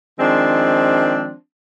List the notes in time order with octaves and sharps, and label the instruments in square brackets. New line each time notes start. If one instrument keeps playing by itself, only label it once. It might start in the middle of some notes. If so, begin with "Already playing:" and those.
[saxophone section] D#3 F3 G#3 C4 D4